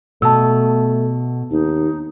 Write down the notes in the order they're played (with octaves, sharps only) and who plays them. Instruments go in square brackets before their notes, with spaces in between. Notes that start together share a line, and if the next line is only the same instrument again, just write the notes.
[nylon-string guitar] B2 [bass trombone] A3 [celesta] A5 E6
[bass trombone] D#2 [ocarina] D#4